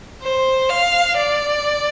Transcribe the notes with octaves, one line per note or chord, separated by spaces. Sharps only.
C5
F5
D5